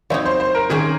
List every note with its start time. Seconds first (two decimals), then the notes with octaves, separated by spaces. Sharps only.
0.10 F#3 C4 D#4 C#5
0.26 C5
0.40 C5
0.55 A#4
0.70 D#3 A#3 C#4 G#4